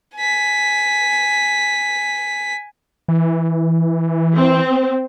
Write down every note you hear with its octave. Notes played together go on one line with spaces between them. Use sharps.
G#5 B6
E3
C4